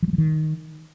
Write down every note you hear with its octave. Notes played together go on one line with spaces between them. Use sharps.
F3
G3
F3
D#3